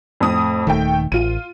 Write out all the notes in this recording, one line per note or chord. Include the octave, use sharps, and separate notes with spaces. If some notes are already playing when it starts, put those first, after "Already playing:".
F2 A2 D#6
D#1 D#3 A3 G5
A1 F4 D#7